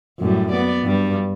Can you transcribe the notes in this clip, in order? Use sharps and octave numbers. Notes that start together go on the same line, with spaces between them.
F#2 A2 G3
B3 D5
G2 G3